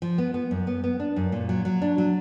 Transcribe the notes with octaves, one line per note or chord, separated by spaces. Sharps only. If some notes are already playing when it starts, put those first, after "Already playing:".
F3
B3
B3
F#2
B3
B3
D4
F#2
A#2
F#3
F#3
D4
F#3